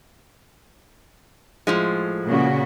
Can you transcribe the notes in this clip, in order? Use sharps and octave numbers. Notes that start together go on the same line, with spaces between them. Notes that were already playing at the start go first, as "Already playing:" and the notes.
A2 F3 G#3
A#2 C#3 F#4